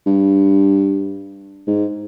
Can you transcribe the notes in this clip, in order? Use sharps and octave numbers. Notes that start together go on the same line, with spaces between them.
G2
G#2